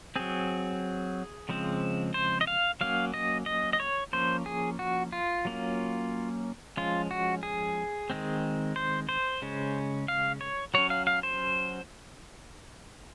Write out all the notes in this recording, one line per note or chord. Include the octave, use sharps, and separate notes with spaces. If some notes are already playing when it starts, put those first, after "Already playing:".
F#3 C4 G#4
C#3 F3 G#3 C4
C5
D#5
F5
F#3 A#3 C#4 F5
D#5
D#5
D#5
C#5
F3 A#3 C#4 C5
G#4
F#4
F4
F#3 A#3 C#4
F3 G#3 C#4 F4
F#4
G#4
D#3 G#3 C4
C5
C5
C#3 G#3 C#4
F5
C#5
F#3 C#4 C#5
F5
F5
C5